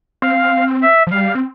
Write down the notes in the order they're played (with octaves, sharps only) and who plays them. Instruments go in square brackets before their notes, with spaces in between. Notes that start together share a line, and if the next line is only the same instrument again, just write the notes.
[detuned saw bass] C4 [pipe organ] F5
[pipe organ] E5
[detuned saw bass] F3
[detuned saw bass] G3 [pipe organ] F5
[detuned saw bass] C4